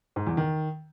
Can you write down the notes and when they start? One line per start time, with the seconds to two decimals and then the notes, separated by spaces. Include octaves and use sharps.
0.16 G#2
0.27 E2
0.37 D#3